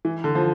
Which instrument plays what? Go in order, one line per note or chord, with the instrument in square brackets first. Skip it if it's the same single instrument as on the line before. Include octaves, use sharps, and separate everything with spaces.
[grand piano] E3
D3
F3